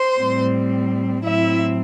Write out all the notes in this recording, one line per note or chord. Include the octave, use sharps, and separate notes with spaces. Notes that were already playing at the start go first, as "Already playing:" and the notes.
Already playing: C5 C6
A2 G3 C4
A2 F#3 C4 E4 E5